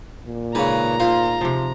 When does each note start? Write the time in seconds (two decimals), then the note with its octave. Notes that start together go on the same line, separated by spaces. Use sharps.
0.24 A#2
0.55 G#2 C#3 B4 A#5
1.00 F4 C5
1.41 C3 F3